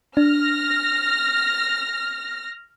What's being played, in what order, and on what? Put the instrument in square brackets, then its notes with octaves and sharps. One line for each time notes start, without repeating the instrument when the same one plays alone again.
[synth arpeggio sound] D4 [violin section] F6 A#6